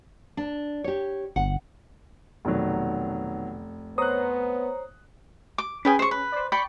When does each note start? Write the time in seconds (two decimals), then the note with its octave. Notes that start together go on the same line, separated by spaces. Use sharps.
0.37 D4
0.84 G4 C#5
1.36 G1 F#5
2.45 F1 B2 D#3 F#3
3.98 B3 C5 C#5 A#5 D#6 F#6
5.58 D6
5.85 C#4 G#4 B4 G5 G#5
5.99 C5 C#6
6.11 B4
6.32 C5 D5
6.52 D5 G5 B5 C#6 C#7